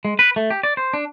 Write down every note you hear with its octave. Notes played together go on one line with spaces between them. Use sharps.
G#3
B4
A3
G4
D5
C5
D4